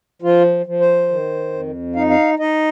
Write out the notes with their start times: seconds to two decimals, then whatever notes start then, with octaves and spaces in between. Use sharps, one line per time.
0.22 F3 F4
0.66 F3
0.80 C5
1.09 D#3
1.53 F2
1.96 D#4 F5
2.10 F5
2.39 D#4 D#5